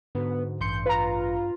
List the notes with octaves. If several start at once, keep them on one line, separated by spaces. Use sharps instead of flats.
G#2 D3 B3 F#4
A1 G2 C6 G6 C#7
F4 B4 A#5